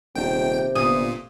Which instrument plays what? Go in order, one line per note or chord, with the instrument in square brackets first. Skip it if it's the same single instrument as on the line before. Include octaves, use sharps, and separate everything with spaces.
[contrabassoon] D#1 [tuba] C3 [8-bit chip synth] G5
[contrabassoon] G1 [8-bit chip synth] A#2 [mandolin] D#6